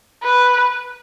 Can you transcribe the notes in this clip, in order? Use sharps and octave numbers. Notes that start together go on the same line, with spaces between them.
B4